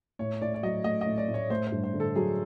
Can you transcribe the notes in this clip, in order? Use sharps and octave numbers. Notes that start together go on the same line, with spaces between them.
A2 C#5
A2 D5
D5
F#3 D#5
A3 D#5
D#5
A2
D5
A2
C#5
A3 C5
C5
G2
C5
D3
A4
F#3 G#4